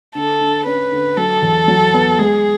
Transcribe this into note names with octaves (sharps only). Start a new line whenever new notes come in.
D3 A4
D3
C#4 B4
D3
F#3 A4
E2
F#3
B3
G#3 G#4